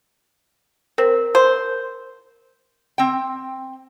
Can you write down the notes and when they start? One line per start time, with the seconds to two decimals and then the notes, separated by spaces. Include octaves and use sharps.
0.98 C4 A#4
1.35 C5
2.98 C4 G5